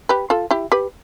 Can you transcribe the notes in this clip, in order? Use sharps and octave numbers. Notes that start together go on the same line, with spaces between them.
G4 B4
F4 A4
E4 G4
G4 B4